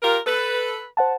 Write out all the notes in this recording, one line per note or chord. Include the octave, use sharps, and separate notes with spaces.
F4 G4 A#4
A4 B4
C5 F#5 A5